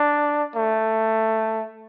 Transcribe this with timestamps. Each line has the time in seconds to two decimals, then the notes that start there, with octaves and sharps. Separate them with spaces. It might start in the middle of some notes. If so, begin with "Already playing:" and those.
Already playing: D4
0.56 A3